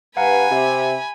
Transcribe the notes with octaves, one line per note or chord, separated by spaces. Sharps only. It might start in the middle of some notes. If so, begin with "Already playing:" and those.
G2 B4 F5 F#5 G#5 A#5 B5
C3 G4 E5